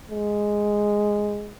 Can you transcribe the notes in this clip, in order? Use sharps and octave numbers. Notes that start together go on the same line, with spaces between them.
G#3